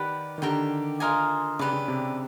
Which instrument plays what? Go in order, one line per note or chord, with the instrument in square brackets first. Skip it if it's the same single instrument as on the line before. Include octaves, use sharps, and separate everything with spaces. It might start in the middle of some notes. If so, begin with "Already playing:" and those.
Already playing: [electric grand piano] D#3 [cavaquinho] G4 B4 D5 F#5
[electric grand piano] D#3
[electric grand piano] D3 [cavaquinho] G4 A#4 D5 G5
[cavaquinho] F4 A#4 D#5 G#5
[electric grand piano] C#3 [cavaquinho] G4 B4 D5
[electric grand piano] C#3
C3